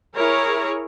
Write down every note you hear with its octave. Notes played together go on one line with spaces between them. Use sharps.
E4 G#4 A#4 C#5